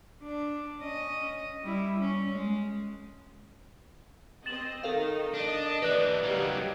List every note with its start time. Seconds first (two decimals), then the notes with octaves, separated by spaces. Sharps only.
0.23 D4
0.81 C#4 D#5
1.64 G3 E4
1.99 C#4
2.32 G#3
4.46 C4 D#5 A6 E7 F#7
4.83 D#3 D#4 A4 A#4 F5
5.34 D4 D#5
5.82 E3 G4 B4 D5 F#6
6.23 F#3 G3 A#3 D#4